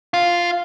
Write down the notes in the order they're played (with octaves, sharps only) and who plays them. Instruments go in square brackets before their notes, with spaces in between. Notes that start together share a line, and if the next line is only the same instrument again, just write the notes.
[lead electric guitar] F4